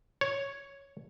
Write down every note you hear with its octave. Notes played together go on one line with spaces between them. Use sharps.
C#5